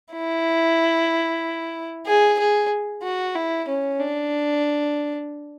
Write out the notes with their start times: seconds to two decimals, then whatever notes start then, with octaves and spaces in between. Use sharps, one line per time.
0.13 E4
2.06 G#4
2.39 G#4
3.03 F#4
3.35 E4
3.68 C#4
3.99 D4